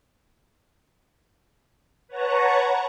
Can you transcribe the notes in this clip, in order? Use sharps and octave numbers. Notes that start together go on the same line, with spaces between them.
B4 C#5 F#5 A5 A#5 C#6